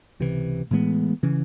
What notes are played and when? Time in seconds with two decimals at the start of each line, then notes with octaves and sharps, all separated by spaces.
0.20 C#2 C3 E3
0.71 A2 E3 G#3 B3
1.23 C#3 E3